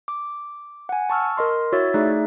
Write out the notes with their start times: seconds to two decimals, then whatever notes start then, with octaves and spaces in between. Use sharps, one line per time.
0.08 D6
0.89 F#5 G#5
1.10 A5 C#6 E6 F6
1.37 A#4 D#5 C6
1.72 E4 F#4 C#5 E5 E6 A6
1.94 A3 D#4 G#4 D5 E5 F#6